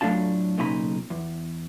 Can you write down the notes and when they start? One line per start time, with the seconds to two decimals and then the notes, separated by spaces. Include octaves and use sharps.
0.01 A2 F#3 A3 D4 F4 A5
0.58 B1 A#2 C#3 D#4 A#5 B5
1.10 E2